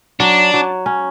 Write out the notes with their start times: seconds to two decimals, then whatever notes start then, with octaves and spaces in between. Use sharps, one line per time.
0.20 F#3 D4
0.54 F#3
0.86 C#4